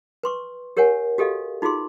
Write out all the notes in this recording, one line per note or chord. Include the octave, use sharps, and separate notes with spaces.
B4 C6 C#6
G4 A#4 C#5 F#5 G#5
F#4 G4 A4 D#5 F5
D#4 F4 F#4 G#4 C6